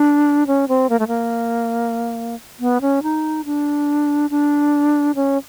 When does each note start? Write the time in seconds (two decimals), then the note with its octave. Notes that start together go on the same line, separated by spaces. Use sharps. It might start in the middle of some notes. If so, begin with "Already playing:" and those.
Already playing: D4
0.47 C#4
0.68 C4
0.90 A#3
0.99 A3
1.08 A#3
2.60 B3
2.81 C#4
3.03 D#4
3.45 D4
4.30 D4
5.15 C#4